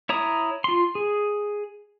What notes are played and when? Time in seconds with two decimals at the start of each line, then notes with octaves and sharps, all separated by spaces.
0.09 E4 C#5 A#5 D#6
0.64 F4 C6
0.95 G#4